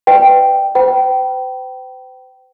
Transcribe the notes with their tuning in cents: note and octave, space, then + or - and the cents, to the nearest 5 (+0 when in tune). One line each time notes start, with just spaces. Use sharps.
B4 +20 D5 +40 G5 +0
C5 -45 G5 -25 B5 -35